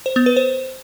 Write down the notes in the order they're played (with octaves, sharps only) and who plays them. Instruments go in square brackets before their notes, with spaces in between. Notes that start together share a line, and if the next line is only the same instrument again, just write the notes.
[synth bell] C5
B3
B4
C5